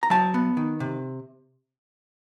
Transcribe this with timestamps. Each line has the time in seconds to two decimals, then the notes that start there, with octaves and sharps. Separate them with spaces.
0.03 A#5
0.10 F#3 A5
0.34 B3
0.57 D#3
0.80 C3